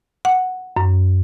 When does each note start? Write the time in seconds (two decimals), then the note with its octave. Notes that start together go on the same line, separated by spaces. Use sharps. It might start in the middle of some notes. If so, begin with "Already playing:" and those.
0.25 F#5
0.76 F#2